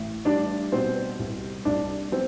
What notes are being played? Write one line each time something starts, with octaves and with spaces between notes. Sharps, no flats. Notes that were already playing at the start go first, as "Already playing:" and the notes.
Already playing: A1
G3 D4 D5
B2 C4 C5
C2
C2 D4 D5
B3 C4